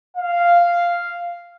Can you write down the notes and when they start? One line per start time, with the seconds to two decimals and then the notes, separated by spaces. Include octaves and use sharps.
0.16 F5